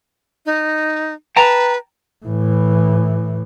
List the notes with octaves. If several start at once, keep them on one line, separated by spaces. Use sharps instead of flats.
D#4
B4 G5 A5 A#5
A2 E3